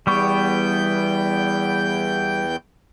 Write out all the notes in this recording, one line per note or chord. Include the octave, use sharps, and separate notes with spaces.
E2 G3 B3 G5 C#6 G6